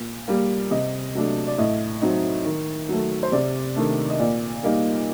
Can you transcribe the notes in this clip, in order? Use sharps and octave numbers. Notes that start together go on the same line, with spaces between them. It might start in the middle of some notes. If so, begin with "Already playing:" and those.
Already playing: A#2
G3 A#3
C3 D#5
F#3 A3 D4
D5
A2 D#5
F#3 C4 D#4
D#3
F#3 A3
C5
C3 D5
D#3 A3 D4
D#5
A#2 D5
G3 A#3 D#4